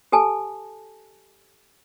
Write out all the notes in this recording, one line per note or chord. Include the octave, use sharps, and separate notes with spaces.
G4 A4 G#5 A5